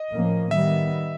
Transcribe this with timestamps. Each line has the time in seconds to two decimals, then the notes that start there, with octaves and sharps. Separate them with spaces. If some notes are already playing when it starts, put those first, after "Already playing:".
Already playing: D#5
0.10 A2 F3 A#3 C#4
0.51 D#3 G3 B3 E5